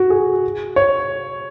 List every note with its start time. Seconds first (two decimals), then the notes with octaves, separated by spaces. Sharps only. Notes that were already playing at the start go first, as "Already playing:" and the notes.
Already playing: F#4
0.10 G#4
0.76 C#5